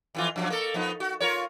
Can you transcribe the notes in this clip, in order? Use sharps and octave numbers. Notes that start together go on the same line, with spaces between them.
F2 E3 F4
F#2 F3 F#3
A#3 A4
F3 B3 D#4
F#4
F4 A#4 C#5